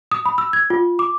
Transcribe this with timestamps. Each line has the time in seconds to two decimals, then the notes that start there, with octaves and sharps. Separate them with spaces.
0.12 D#6
0.26 B5
0.38 E6
0.53 G#6
0.70 F4
0.99 D6